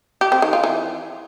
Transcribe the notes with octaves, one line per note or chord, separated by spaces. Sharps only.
G4
C4
D#3
F4
E3